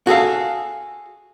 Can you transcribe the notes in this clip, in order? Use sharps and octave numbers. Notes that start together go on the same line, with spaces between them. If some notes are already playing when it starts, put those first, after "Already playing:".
F#4 G#4 A4 F5